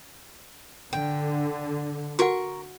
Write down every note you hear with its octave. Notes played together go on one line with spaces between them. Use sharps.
D3 G5
F#4 A#4 F#5 C#6